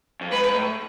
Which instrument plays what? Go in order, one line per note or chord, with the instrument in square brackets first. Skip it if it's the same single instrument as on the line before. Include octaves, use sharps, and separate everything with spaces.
[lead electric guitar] F2
[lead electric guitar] G#2 [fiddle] B4
[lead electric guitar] G#2
A2